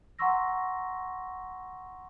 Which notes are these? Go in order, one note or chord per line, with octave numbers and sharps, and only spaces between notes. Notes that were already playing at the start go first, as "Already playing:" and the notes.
F#5 A#5 C6 C#6 E6 A#6